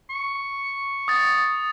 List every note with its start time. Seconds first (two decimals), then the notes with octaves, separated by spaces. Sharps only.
0.10 C#6
1.08 D#6 A6